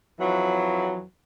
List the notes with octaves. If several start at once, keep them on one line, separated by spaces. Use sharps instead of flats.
F2 E3 F#3